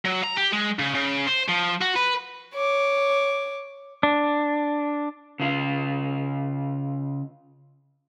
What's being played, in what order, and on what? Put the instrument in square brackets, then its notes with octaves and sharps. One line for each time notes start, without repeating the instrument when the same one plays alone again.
[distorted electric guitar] F#3
A#5
G4
G#3
C#3
C#3
C5
F3
F#4
B4
[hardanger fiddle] C#5 D6
[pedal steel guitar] D4
[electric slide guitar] C#3 F4